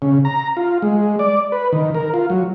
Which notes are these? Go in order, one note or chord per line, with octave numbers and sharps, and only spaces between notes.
C#3
A#5
F4
G#3
D5
B4
D#3
A#4
F4
F#3